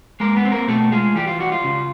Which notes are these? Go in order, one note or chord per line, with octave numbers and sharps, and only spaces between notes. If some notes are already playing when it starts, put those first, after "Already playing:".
G#3 A#3 A#4
B3 B4
C4
A#3 A#4
B2 A3 A4
G#3 F4 G#4
E3 G3 G4
F4
G3 F#4
F4
C#3